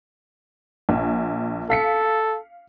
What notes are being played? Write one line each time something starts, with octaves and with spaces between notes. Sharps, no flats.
A#1
A4 F5 B6 C#7